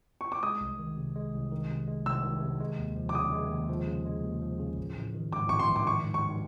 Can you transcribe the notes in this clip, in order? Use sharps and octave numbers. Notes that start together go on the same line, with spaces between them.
C#6
D6
G#3 D#6
C2
D#3
C3
G#3
C2
D#3
C3
G#3
C2 E6
D#3
C3
G#3
D#2
F3
D6
C#3 D#6
G#3
D#2
F3
C#3
G#3
D#2
F3
C#3
A1
A1
D#3
G#2 D6
A1 C#6
C6
A1
D6
D#3 C#6
G#2
C#6